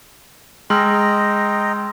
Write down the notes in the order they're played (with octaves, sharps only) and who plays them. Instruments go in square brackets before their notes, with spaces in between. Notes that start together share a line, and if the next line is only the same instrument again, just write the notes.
[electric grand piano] G#3 [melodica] D#5 G5 A#5 [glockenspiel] C6 E6 F6